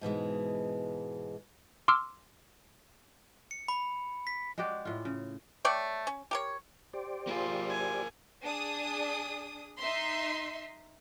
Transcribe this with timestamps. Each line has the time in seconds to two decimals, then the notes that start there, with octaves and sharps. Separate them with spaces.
0.01 G#2 B2 E3 G#3
1.88 C6 D6 E6 F6
3.51 C#7
3.68 B5
4.27 B6
4.58 G#3 F#4 G4 D5
4.85 A2 F4
5.05 C#3
5.65 A3 C#5 D5 G5
6.07 C#4
6.31 G4 A#4 C#5
6.94 G4 C5 D5
7.27 A#3 F4 G#4
7.70 G#5
8.43 D4 G#4 D#6
9.78 D#4 E5 C6